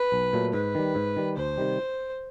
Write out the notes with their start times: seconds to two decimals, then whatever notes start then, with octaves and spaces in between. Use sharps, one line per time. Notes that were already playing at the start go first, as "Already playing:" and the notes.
Already playing: B4
0.12 B1
0.33 A#2 F#3 A3
0.53 G#2 B4
0.75 D#3 G3
0.95 G#2
1.16 D#3 G3
1.37 D2 C5
1.58 C3 D#3 G3